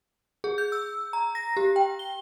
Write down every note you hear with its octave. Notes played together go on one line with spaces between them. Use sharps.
G#4
G6
E6
A#5
A#6
G4
G5
G7